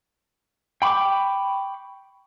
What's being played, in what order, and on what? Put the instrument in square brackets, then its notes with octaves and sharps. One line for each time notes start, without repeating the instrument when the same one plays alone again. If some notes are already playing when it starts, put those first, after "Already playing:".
[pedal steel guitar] G5 B5 C#6 D6